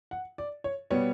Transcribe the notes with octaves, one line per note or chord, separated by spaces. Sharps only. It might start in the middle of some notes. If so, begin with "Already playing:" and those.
F#5
D5
C#5
B2 G3 B3 C#5